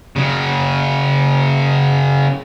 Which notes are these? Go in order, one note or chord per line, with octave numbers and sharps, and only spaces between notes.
C#3 F#3